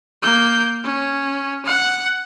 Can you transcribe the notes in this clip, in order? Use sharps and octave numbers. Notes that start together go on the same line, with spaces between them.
A#3 G6
C#4
F#5